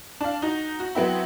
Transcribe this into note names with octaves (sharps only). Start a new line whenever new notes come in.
D4 F5
D#4 F#4
F#4
F#3 B3 C4 E4